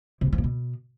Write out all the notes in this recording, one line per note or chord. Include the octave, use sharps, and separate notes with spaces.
C3
F#2
F3
A#2
B2